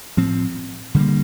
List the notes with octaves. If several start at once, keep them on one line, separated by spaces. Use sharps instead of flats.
A2 F3 C4
D3 G3 A#3